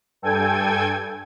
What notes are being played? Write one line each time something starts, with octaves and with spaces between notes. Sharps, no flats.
G2 A4 G5 G#5 G#6